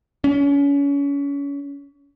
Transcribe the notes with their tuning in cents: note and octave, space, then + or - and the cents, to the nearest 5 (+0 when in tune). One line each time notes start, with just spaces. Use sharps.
C#4 +30